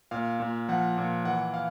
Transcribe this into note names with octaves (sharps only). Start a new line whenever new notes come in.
A#2 F5
A#2
F3 F#5
A#2
E3 F#5
F5